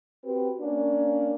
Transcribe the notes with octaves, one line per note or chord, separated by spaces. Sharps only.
C4 F#4 G4 B4
A#3 C#4 D4